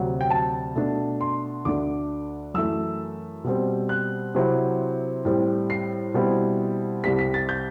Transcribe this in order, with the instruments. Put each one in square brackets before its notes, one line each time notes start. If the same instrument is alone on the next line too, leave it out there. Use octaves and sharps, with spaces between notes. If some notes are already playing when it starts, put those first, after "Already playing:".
Already playing: [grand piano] D2 C3 F#3
G5
A5
B2 A3 D4
C6
D2 D3 A3 D4 D6
F#2 E3 A3 E6
B2 G3 C4
F#6
C3 F#3 C4 E4
A2 G3 C4
C7
B2 G3 C4 E4
C2 C3 G3 B6
B6
A6
G6